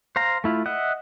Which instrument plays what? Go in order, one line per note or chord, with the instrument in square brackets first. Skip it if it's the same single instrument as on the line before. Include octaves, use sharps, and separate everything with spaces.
[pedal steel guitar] C5 F5 A#5
A3 E4 F4
D#5 E5 F#5